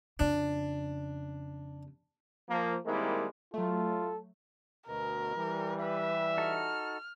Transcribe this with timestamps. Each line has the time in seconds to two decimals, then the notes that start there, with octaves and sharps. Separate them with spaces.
0.19 F2 C#3 D4
2.48 F3 A#3
2.85 D#3 G3 G#3 A#3 C4 E4
3.54 F#3 A3 F4 A4
4.87 D2 B2 A#4
5.36 E3 G3
5.80 B4 E5
6.38 D#4 F#4 A4 F6